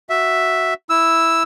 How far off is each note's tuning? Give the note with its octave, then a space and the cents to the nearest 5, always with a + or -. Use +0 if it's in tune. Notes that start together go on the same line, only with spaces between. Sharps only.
F#4 +0 E5 +0
E4 +0 E6 +0